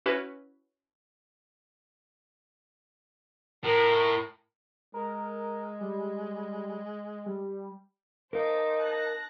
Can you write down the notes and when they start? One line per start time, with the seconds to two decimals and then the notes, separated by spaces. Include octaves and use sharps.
0.06 C#4 E4 F#4 B4
3.64 A2 A#4
4.94 G#3 A#4
5.81 G3
7.26 G3
8.33 D#4 A#4 C5 F5 A5 D6
8.78 A5 F#6 A#6